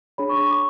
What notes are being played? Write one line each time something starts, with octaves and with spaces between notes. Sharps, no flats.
D4 G#4 C#5 B5
C#6
C#6
D6